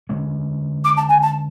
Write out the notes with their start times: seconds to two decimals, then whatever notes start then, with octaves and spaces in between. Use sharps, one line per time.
0.09 D3 G#3 C#4
0.84 D6
0.97 A5
1.09 G#5
1.22 A5